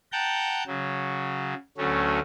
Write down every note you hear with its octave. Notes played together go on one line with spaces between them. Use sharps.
F#5 G5 A5 A#5 G6
C#3 F#3
D2 F#3 A3 C#4